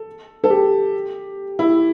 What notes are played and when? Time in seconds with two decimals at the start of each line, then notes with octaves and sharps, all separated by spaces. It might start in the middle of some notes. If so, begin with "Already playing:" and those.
Already playing: A4
0.44 A4
0.50 G4
1.59 E4